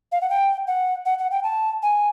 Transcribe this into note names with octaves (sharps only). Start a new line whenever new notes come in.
F5
F#5
G5
F#5
F#5
F#5
G5
A5
G#5